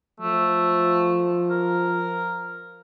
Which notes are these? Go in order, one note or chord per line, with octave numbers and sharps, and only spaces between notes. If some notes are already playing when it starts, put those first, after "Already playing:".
F3 A3
A#4